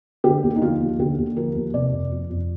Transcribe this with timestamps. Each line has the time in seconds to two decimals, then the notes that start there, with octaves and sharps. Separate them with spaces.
0.24 D3 G4
0.43 D#2
0.56 D#4
0.62 F3 F4
0.80 D#2
0.99 D3 G4
1.18 D#2
1.36 F3 A#4
1.55 D#2
1.74 C3 D5
1.93 F2
2.12 F3
2.30 F2